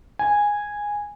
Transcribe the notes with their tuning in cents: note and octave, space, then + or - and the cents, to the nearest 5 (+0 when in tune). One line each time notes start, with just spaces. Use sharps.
G#5 -10